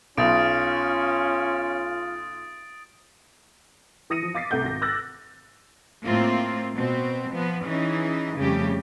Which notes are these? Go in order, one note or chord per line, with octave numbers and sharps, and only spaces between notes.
B1 C#4 F4 D#6 A6 D7
E3 D#6 A#6 C#7 D#7
F3
F5 D6 A6 B6 C7
C2 A3 F#5 G6
G#1 A#6
D6 E6 F#6 A6 A#6
A2 A3 A#3 C4 F4
B2 C4
F3 B3
E3 C#4 D#4 G#4
F2 C#3 G3 A3 C#4 G4